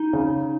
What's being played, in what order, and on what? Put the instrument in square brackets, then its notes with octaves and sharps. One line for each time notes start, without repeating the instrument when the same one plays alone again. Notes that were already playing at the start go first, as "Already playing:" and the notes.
Already playing: [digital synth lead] D#4
[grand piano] C#3